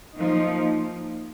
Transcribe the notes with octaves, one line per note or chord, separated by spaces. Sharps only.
F3 A#3 D#4